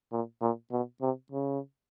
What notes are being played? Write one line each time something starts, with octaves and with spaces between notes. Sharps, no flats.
A#2
A#2
B2
C3
C#3